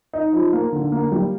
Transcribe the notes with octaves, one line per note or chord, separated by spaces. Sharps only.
D#4
F3
A#3
D3
A#3
G3